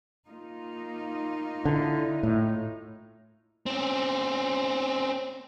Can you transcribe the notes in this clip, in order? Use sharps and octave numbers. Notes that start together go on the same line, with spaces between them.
A#3 D#4 F4
D3 E4
A2
C4 C#4